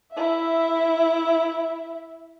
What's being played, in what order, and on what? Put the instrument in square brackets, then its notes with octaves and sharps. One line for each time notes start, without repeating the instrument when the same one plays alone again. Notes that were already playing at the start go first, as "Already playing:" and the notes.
[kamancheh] E4 E5